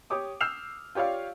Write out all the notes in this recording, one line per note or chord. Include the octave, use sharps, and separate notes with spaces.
G4 C#5 D6 D#6
E6 F6 G6 C7 E7 F7
F4 G4 C#5 D5 F5